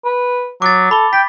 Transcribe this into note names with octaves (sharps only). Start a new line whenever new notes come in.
B4
F#3 D6 A6
A4 B5 G7
G5 B6